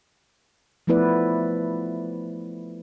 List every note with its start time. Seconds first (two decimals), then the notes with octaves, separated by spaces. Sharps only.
0.87 F3 A3 B3 E4 B4 D5